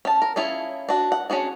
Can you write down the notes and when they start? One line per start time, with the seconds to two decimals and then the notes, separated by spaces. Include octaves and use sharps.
0.05 C#4 A5
0.22 A#4
0.36 C#4 E4 F4 G#4
0.89 D4 F#4
1.12 F#5
1.30 C#4 D4 F#4 G#4